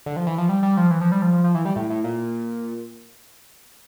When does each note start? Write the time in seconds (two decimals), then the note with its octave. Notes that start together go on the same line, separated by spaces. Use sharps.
0.06 D3
0.16 F3
0.27 E3
0.38 F3
0.49 G3
0.63 G3
0.77 F3
0.90 E3
1.01 F3
1.12 G3
1.22 F3
1.33 F3
1.44 F3
1.55 E3
1.65 G3
1.76 A2
1.90 A2
2.04 A#2